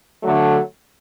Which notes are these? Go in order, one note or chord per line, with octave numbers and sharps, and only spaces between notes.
D3 F#3 A3